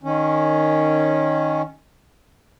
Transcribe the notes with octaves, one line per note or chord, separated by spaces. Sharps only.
D#3 C#4